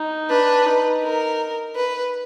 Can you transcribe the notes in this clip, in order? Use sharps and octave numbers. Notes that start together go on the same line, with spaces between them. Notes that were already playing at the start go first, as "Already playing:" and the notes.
Already playing: D#4
D4 B4
D#4
A#4
B4